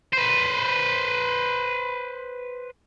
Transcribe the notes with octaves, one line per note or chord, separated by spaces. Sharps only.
B4 C5